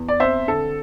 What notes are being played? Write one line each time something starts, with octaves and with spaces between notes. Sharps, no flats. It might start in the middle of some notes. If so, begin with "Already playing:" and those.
Already playing: E2
D5
C4 C5 E5
D3 A4